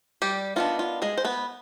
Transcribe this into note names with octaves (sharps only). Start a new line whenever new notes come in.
G3 G4
D#3 B3 D4 F4
F4
G#3 G#4
C5
B3 B4